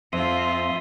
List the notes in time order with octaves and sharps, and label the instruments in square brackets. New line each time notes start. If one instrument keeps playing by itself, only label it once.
[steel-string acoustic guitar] F2 [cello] C4 F4 [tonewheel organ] E5 C6 D#6